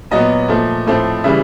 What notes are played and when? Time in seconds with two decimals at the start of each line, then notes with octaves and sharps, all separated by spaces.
0.11 A#2 F#3 B3 D#5
0.48 A#2 F3 A3
0.86 A2 F3 A3 C4
1.24 C#3 E3 G3 E5